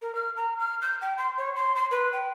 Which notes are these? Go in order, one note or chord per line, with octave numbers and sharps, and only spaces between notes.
A#4
F6
A#5
F6
G6
G5
C6
C#5
C6
C6
B4
G5